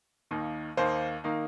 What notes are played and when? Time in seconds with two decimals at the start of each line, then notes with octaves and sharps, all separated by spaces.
0.31 D#2 D#3 A#3 D#4
0.77 D#2 D#3 A#3 D#4 C5
1.24 D#3 A#3 D#4